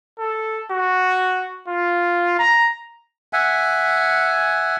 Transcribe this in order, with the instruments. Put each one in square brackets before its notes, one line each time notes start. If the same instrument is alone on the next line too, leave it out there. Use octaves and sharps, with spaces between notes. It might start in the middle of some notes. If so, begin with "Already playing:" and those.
[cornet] A4
F#4
F4
A#5
[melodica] E5 F#5 G#5